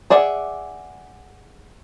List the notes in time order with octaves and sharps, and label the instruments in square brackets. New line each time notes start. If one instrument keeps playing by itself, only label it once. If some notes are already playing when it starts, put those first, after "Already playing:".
[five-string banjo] G#4 D5 E5 F#5